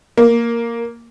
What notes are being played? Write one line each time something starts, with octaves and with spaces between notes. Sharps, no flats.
A#3